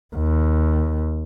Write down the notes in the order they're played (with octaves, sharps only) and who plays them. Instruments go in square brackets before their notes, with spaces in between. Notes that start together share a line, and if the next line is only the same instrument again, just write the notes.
[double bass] D#2